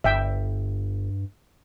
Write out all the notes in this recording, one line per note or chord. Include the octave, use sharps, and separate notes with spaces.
G1 G2 E5 G5